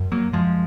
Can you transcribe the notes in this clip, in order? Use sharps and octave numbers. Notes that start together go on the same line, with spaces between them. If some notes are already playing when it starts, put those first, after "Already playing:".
Already playing: F#2
F#3 A#3
F#2 F3 G#3